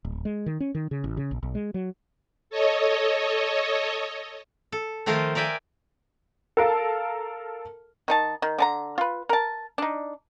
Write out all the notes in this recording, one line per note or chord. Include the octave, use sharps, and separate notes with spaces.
D1
G#3
D#3
C#4
D#3
C#3
A1
C#3
A#1
B1
G#3
F#3
A4 C#5 D#5
A4
D#3 F3 A3 F4 A#4 C5
A#4 D5 E5 G5 G#5
A4 A#4 F5 A5
D#3 D#4 A5
D#3
D3 A5 A#5
F4 B4
A#4 A5
D4 D#4